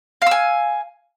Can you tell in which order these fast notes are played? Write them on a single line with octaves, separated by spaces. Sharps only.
F5 E6 G#5